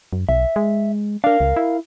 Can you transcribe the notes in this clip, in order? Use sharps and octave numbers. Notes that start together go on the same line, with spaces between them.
F#2
B1 E5
G#3
D4 A#4 F5
C#2
E4